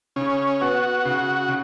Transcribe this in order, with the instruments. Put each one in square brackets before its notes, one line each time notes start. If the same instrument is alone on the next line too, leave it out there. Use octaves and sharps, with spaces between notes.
[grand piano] C#3 [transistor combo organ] C#4
[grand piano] B3 [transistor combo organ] F#4
[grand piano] C#3
C#3